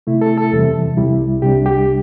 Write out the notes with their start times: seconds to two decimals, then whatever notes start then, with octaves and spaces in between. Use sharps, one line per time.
0.07 C3 A3 E4
0.21 A4
0.38 A4
0.52 E2 C3 E3 G3
0.97 C2 C3 G3 E4
1.42 C2 C3 G3 D4 G4
1.66 G4